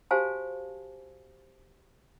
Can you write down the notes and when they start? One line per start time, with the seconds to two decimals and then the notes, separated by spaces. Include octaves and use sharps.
0.11 F#4 G4 C5 F5 G#5 A5